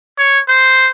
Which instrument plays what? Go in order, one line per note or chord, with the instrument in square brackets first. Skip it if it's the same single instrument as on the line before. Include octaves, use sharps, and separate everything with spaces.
[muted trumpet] C#5
C5